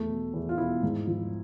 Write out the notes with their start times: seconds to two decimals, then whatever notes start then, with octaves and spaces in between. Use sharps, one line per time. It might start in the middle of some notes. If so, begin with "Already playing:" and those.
Already playing: E2 A3
0.09 B2
0.34 E2
0.49 F4
0.58 B2 E4
0.83 G#2
1.07 F3